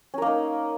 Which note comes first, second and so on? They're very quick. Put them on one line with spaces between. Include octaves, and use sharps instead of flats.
C#4 A#4 A#3 D#4